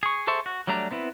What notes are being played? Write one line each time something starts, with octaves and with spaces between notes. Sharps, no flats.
G#4 C#6
G#4 A4 C5 E5 C#6
F#4
F#3 G3 A3 D4 A#5
B3 C4 E4 B4